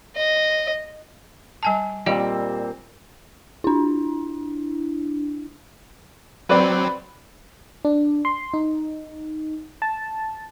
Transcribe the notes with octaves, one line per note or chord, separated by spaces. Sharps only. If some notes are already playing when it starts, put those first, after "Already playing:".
D#5
G3 G#5 A5
A#2 G3 C4 D#5
D4 E4
F#3 C4 B4 D5
D4
C6
D#4
A5